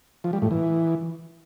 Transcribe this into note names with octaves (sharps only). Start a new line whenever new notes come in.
F3
G3
A2
E3